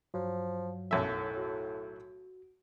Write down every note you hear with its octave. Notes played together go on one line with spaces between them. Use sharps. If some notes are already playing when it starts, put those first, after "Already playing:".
G2 F3 F#3
B1 F#2 A2 E5
F#4